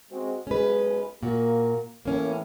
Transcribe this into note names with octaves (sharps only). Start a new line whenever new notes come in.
G#3 C4 F#4
B1 G#3 C#4 B4
A#2 A#3 F#4
A2 E3 A#3 C#4